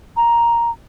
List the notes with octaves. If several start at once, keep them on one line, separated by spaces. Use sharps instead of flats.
A#5